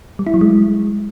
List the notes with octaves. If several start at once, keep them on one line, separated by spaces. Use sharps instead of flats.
G3
E4
F#3
G#3